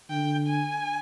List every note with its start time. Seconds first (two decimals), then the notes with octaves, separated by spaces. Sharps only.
0.10 D3 G5
0.47 G#5